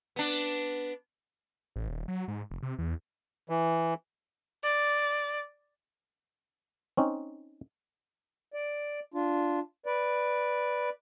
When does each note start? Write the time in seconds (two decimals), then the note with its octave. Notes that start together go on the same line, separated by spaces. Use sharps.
0.16 B3 D4
1.76 A1
1.88 D#1
2.08 F#3
2.28 G#2
2.51 F1
2.63 C3
2.79 E2
3.49 E3
4.63 D5
6.97 C4 C#4 D#4
8.54 D5
9.14 D4 F4
9.86 B4 D5